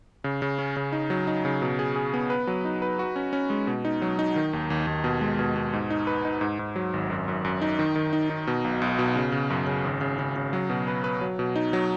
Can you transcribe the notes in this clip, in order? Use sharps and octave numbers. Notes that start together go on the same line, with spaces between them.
C#3
C#3
C#4
C#3
D#4
F#3
D#4
C#3
B2
G#4
G#4
B3
B4
F#3
D#4
B4
F#4
C#4
C#4
G#3
B2
D#4
F#3
D#4
D#3
D#2
D#2
D#2
B2
G#3
B2
B2
G#2
D#4
B4
D#4
G#2
G#2
F#3
G#1
F#2
F#2
F#2
D#4
D#3
D#3
D#4
D#4
B2
B1
B1
B2
C#3
C#3
F#2
C#3
G#1
C#3
C#3
C#3
F#3
B2
B4
B4
F#3
B2
D#4
F#3